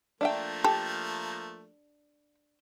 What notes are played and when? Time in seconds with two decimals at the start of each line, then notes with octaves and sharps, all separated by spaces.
0.21 F3 A3 A#3 D4 E5 G5
0.64 G4 A4